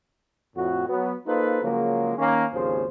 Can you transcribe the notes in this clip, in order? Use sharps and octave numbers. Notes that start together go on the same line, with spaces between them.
F2 A2 F#4
F#3 B3
A#3 D#4 F4 A4 B4 C5
C#3 F3 F#3 G#3 A#3
D#3 A#3 C#4
G#1 D#2 C#3 F3 G#4 C5